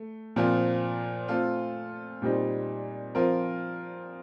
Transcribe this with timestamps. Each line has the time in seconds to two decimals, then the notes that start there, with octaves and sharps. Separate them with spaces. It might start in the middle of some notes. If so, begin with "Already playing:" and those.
Already playing: A3
0.36 A#2 F3 C4 F4
1.28 A3 C4 F4 A4
2.22 A#2 G3 C4 D#4
3.15 F3 C4 F4 A#4